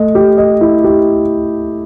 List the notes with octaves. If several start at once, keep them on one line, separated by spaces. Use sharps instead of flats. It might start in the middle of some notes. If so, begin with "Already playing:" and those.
Already playing: A3 D#5
G4
D#5
E4
G4